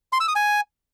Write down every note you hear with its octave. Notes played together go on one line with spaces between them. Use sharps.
C6
E6
D#6
G#5